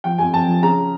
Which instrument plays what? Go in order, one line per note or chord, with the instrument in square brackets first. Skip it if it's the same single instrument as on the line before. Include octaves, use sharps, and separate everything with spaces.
[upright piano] F3 G5
F2 G#5
F2 A5
F3
C#3 A#5